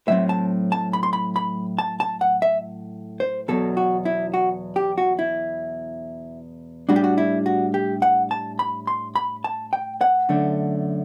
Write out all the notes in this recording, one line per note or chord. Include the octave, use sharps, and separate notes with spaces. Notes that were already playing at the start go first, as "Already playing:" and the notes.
A2 F#3 C4 E5
A5
A5
B5
C6
B5
B5
A5
A5
F#5
E5
C5
E2 B2 F#3 A4
F#4
E4
F#4
G4
F#4
E4
A2 G3 D4 F#4
G4
F#4
E4
F#4
G4
F#5
A5
B5
C6
B5
A5
G5
F#5
F#2 D3 A3 D4